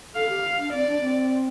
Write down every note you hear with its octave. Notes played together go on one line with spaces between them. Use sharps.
A4 F5
G4
D4
C4 D5
D4
C4